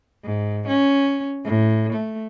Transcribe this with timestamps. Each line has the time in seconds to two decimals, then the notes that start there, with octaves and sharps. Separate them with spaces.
0.24 G#2
0.68 C#4
1.45 A2
1.93 A3